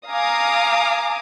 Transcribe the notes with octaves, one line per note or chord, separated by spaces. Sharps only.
F5 G#5 A#5 D6 D#6